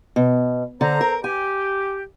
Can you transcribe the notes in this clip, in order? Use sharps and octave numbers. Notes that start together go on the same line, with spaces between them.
B2
D3 A4 C5 A#5
A#4
G4 G#5